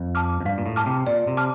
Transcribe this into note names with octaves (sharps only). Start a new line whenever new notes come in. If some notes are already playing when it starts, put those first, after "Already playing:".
Already playing: F2
A5 D6 F6
F2
G2 F5
A#2
A2
A5 D6 F6
C3
A#2 D5
C3
A5 D6 F6